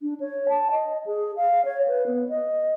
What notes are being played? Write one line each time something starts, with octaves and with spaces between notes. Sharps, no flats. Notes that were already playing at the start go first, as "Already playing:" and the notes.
D4
C#5
A5
D#5
G#4
F5
C#5
B4
B3
D#5